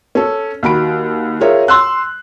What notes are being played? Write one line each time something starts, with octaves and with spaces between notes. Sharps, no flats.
C#4 A4
D#2 F#4 B5 D7
F4 G#4 A#4 C#5 E5
C6 E6 F#6